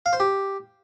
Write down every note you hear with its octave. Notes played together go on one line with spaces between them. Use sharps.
F5
C5
G4